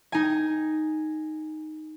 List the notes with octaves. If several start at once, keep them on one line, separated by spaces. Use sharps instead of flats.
D#4 G#5